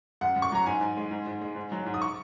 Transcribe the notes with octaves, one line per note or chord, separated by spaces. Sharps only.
F#2 F#5
F#2
C#6
F#3 A#5
G#2 G#5
G#2
G#3
G#2
G#2
G#3
G#2
F#3
G#2
D#6
C#6